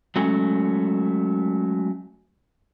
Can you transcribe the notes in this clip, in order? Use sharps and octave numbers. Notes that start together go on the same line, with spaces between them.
F#3 G#3 A3 C#4